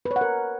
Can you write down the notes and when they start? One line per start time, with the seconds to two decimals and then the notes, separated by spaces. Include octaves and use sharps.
0.05 B4
0.11 C#5
0.16 F#5
0.21 A#4